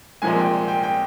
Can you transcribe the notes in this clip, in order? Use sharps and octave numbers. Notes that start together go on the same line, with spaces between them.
C2 A#2 F3 G#3 G#5
G5
G5
G5